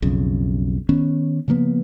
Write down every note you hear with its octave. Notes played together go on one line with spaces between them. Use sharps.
B1 F2 C#3
D#3 B3 C#4
C#3 F3 A#3 B3